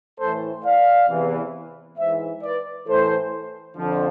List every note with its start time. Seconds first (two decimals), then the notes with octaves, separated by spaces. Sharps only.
0.19 A2 E3 A4 C5
0.64 D5 F5
1.09 E2 C3 E3
1.98 G#2 E3 C5 E5
2.43 B4 D5
2.87 A2 E3 A4 C5
3.77 F2 D3 F3